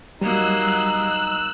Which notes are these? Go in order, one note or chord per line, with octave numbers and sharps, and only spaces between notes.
F#3 G3 A#3 D#4 D#5 E6 F#6